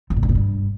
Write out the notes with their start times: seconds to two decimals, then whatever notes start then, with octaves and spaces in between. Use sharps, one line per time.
0.10 F2
0.17 A#2
0.23 G2
0.29 A#2
0.35 G2